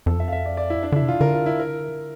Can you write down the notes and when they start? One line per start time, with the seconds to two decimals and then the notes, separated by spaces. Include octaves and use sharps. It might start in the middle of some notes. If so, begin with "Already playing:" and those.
0.06 F2 A4
0.20 E5
0.28 F5
0.32 E5
0.46 D5
0.57 D5
0.70 E4
0.83 D4
0.92 D3 E4
1.02 C3
1.08 F4
1.21 D3 A#4
1.33 F4
1.46 E4
1.59 A#4